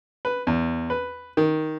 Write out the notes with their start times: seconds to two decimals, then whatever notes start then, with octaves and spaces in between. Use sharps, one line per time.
0.25 B4
0.47 E2
0.90 B4
1.37 D#3